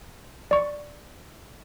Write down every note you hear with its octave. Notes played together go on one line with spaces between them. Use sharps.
D5 C#6